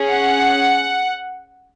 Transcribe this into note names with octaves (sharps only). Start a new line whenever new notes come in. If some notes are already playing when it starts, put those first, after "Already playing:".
Already playing: C#4 G#4
F#5